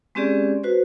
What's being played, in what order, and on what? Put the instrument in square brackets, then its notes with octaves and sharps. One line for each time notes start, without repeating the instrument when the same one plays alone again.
[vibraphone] G#3 C4 C#4 G4 G#4 D5
F#4 B4 C5